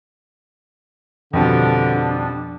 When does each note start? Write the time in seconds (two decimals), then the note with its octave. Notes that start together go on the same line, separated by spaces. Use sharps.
1.33 F2 B2 D3 G3 D4